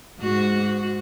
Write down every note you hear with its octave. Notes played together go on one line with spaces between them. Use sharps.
G#2 F#4